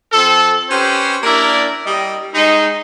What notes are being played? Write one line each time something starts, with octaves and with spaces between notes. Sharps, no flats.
F3 C4 A4
C#4 G4 B4 C5
A#3 D4 E4 A#4 D5
G3 G4 D#5
G#3 D#4